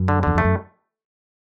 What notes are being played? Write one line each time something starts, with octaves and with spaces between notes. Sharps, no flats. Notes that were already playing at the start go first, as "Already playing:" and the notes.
Already playing: F#2
D3
E2 D3
F2 A3
F#2